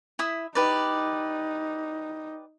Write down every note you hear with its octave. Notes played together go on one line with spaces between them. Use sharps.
E4 E5 D#6
D#4 G4 B4 D5